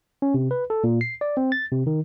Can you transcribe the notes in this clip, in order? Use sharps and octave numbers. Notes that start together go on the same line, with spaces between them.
C#4
C3
B4
A4
A#2
C7
D5
C4
A6
C3
D#3